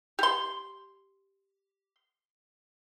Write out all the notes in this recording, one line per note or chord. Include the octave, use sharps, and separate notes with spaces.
G4 C6